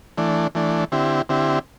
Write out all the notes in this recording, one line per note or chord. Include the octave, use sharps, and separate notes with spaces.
E3 A3 D4
E3 A3 D4
D3 C4 E4 G4
D3 C4 E4 G4